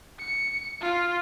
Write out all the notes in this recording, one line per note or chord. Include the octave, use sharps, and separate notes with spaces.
C#7
F4